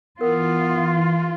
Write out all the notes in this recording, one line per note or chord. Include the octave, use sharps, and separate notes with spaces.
E3 B3 F4 A#4 F5